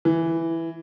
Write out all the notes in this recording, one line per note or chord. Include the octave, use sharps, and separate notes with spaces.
E3